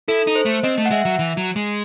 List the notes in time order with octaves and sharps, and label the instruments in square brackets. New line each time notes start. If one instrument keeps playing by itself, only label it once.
[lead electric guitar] E4 [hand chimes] A4
[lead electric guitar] D#4
[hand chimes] C5
[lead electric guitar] A3
[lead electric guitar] C4 [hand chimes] D#5
[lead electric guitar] A3
[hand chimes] F#5
[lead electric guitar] G#3 [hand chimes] E5
[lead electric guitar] F#3
E3
F#3
G#3